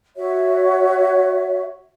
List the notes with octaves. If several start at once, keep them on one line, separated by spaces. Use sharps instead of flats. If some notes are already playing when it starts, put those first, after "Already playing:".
F#4 C#5 E5